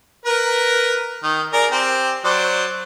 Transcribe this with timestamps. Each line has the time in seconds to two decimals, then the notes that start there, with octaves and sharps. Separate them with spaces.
0.26 A#4 B4
1.23 D#3
1.53 G#4 A#4 D5
1.71 C4 G4
2.24 F#3 C5 D5